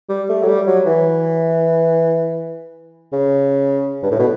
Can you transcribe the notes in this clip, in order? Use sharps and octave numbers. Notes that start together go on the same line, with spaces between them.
G3
A3
F#3
G3
F#3
E3
C#3
G2
A2
B2